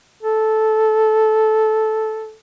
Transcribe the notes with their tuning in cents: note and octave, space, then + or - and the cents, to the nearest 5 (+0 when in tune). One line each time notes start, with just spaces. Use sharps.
A4 -10